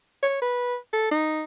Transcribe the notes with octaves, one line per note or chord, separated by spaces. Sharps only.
C#5
B4
A4
D#4